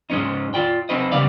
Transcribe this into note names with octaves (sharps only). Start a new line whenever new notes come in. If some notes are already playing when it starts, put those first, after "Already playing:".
G#2 G#3 A#3 C#4 D#4
F4 D5 G5
C4 D#4 B4 D#5
C#3 G3 B3 D5 F5